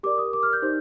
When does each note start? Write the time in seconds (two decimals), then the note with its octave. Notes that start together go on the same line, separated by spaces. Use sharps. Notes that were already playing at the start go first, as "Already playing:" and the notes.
0.03 G4 A#4 D5 D6
0.18 D#6
0.33 D6
0.43 F6
0.53 G6
0.62 D#4 G4 C5